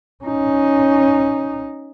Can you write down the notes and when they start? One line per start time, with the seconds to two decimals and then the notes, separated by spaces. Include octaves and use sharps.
0.24 C#4 D#4